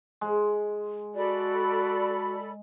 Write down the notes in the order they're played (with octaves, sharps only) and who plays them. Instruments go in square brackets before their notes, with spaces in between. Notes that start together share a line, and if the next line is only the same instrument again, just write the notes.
[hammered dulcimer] G#3
[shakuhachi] F#4 [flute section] A4 D5 B5